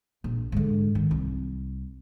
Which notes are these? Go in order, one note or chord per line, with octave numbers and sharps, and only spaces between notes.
A#1
G#2 D3
D#3
C2